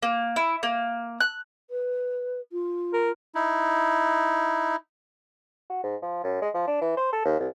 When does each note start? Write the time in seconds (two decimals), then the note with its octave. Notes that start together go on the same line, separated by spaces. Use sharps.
0.02 A#3
0.36 E4
0.63 A#3
1.20 F#6
1.70 B4
2.52 F4
2.93 A#4
3.35 D#4 E4
5.70 F#4
5.84 G#2
6.02 F3
6.24 F#2
6.42 G#3
6.54 F3
6.67 D4
6.81 E3
6.97 C5
7.13 A4
7.25 D#2
7.39 C2